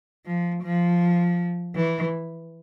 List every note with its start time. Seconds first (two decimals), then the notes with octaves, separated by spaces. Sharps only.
0.26 F3
0.63 F3
1.75 E3